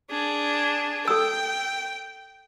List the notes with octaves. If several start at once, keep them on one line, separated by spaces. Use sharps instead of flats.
D4 G#4
A4 G5 E6